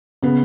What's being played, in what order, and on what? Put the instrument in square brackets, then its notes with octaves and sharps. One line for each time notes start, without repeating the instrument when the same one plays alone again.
[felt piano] C#3 B3